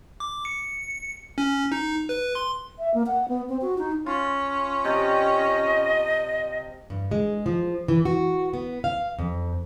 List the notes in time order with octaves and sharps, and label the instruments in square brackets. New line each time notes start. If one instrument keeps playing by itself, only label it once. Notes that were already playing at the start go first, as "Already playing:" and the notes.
[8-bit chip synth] D6
C#7
C#4
D#4
B4
C6
[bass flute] E5
A#3
F#5
B3
C4
F#4
D#4
[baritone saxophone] C#4 [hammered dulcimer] F4
[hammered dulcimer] C3 D5 A5 [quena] D#5
[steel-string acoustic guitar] G2
G#3
F3
E3
F#4
B3
F5
F2